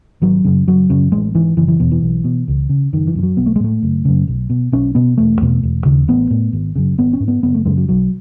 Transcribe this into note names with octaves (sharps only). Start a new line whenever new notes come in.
G#1 F#3
F#2 C#3
F#1 F#3
F#2 C#3
A1 G#3
G#2 E3
F#1 E3
E3
E2 B2
E3
B1
B2
C#2
C#3
F#1 D#3
E3
F#2 C#3
F#3
B1 B3
A3
G#3
A2 A3
F#1
F#2 C#3
B1
B2
B1 C#4
B2 B3
E1 A3
E2 B2
E1
D#2 C#3
A1 B3
A2
G#1
F#2 C#3
G#1 B3
C#4
G#2
B3
F#1 B3
A3
F#2 C#3 G#3
F#3
B1 F#3